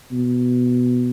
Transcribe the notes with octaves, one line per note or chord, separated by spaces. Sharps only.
B2